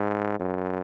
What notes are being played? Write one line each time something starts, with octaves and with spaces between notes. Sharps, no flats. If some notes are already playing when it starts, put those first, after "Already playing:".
Already playing: G#2
F#2